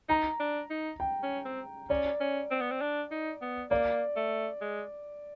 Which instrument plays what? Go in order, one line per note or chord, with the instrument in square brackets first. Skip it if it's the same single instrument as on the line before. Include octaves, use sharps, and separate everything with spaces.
[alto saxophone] D#4 [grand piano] A#5
[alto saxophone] D4
D#4
[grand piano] G5
[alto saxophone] C#4
C4
[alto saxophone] C#4 [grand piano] D5
[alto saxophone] C#4
C4
B3
C4
D4
D#4
B3
[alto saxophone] A#3 [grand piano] D5
[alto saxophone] A3
G#3